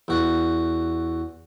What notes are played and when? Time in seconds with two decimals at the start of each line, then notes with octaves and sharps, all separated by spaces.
0.08 E2 F#4